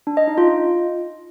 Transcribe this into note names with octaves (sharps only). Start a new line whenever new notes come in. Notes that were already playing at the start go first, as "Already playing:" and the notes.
D4
D#5
D#4
F4
F4